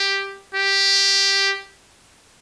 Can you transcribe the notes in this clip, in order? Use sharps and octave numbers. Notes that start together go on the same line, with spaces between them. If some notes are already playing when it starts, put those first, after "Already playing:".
Already playing: G4
G4